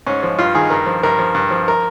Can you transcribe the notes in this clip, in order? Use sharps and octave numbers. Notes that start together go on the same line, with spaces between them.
G#2 C#4
F3
G2 F4
D#3 G#4
G2 A#4
F3
G2 A#4
F3
G2
F3
A#4